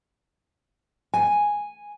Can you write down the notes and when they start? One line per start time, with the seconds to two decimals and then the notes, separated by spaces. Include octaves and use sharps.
1.14 G#5